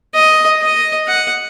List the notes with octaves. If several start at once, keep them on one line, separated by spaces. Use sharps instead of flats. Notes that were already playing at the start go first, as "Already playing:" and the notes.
D#5
D#5
F#5